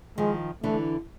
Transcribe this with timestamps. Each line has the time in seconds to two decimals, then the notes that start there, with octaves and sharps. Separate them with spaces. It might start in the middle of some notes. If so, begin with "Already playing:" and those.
0.18 D#3 F3 G#3
0.63 D3 E3 A3